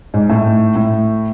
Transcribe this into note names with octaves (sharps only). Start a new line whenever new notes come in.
G#2
A2
A2